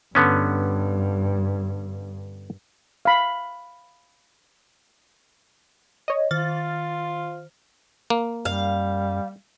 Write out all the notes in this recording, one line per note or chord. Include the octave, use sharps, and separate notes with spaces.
G2 D3 B3 C#4
F5 B5
C#5 D#5
D#3 F4 C5 F6 A6
A#3
F#2 G3 F5